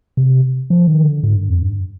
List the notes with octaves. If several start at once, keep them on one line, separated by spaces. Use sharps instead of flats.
C3
F3
D#3
D3
G#2
G2
F2
G2